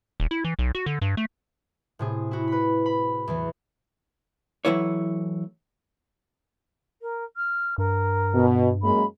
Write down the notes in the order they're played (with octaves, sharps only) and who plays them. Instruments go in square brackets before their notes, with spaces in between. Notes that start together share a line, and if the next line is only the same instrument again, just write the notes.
[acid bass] D#1
E4
E3
B1
F#4
D3
G2
A3
[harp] A2 C3 G#4
E4 F#4
B4 B5
B5
E2 E3
[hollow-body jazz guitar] E3 F#3 A3 E4 B4 C#5
[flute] A#4
F6
[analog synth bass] G2 [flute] A#4
[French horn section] B2
[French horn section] F#2 G#3 A#3 [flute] B5